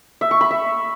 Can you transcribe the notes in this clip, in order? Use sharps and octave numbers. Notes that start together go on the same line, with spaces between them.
E5
C#6
B5
E5